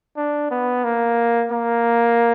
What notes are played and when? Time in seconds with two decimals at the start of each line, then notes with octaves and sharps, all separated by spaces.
0.17 D4
0.51 B3
0.84 A#3
1.52 A#3